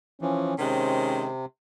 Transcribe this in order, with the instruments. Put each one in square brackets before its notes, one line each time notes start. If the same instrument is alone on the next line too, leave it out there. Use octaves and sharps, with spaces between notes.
[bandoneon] E3 F3 [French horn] C#4
[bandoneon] C3 [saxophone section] D#3 G#3 C5 [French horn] C#4